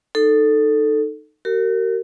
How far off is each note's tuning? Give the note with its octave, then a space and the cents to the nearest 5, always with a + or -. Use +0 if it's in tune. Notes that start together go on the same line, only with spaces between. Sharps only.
D#4 -15 A4 +5
F#4 +45 A#4 -25